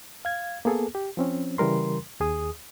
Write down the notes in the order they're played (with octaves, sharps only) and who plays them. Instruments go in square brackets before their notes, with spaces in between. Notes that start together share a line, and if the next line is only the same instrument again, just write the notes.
[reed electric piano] F5 G#6
A#3 B3 G#4 A4
G4
F3 C4 C#4
C#3 E3 G3 A#4 C6
D#2 G#4 D#6